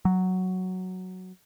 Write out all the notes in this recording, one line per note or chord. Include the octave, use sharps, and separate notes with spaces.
F#3